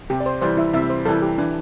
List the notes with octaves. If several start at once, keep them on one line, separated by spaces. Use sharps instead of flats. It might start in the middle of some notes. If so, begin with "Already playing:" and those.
C3 G4
D5
C5
E3 G3 C5
E4 E5
C3 E4 E5
C5
E3 G3 A4
G4
E3 D4